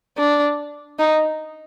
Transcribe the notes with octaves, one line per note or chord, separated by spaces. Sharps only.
D4
D#4